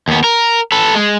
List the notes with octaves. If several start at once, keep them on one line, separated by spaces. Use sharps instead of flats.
D#2 B3
A#4
A4 B4
G#3